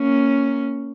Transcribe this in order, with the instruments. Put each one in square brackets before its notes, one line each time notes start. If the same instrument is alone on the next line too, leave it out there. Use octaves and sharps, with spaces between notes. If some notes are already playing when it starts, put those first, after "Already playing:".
Already playing: [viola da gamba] A#3 C#4